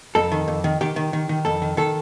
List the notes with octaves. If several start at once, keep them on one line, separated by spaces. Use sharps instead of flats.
F2 A4
D#3
F2
D#3
D#3 G4
D#3
D#3
D#3
F2 A4
D#3
D#3 A4